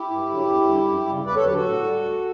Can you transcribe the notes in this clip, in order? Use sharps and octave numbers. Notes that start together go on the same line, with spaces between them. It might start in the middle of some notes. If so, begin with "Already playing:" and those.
Already playing: E4 G4
G2
D3 F#3
E2
D3 G3
F#2
C#3 G3
E2 B4 D5
A4 C#5
D3 F#3 G4 B4
F#4 A4
A2
G3
D2